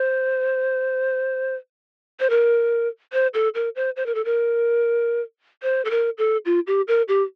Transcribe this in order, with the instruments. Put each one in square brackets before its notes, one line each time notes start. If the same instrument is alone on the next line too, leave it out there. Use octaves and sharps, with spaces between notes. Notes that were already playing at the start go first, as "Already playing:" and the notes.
Already playing: [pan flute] C5
C5
A#4
C5
A4
A#4
C5
C5
A#4
A4
A#4
C5
A4
A#4
A4
F4
G4
A#4
G4